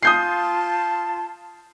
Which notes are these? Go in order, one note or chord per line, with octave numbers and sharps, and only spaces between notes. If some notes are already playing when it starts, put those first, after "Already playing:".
F4 A5 C6 D#6 G6 C7